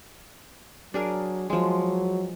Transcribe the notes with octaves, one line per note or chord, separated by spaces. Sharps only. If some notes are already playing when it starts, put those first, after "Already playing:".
F#3 D4 G#4 A#4
F3 F#3 G#3